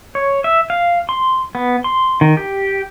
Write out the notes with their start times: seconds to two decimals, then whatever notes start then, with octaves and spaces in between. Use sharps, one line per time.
0.15 C#5
0.44 E5
0.70 F5
1.09 C6
1.55 B3
1.84 C6
2.21 D#3
2.37 G4